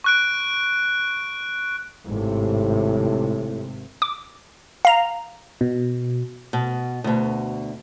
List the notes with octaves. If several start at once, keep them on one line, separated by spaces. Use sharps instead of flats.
C#6 F#6 D7
G#1 A2 C3
D6
F5 A#5
B2
B2
D2 B2